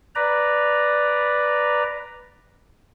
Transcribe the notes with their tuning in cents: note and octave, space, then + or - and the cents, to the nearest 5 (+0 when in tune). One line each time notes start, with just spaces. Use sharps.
B4 +0 D5 +0 A#5 +0